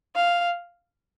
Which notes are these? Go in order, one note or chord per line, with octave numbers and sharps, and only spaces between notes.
F5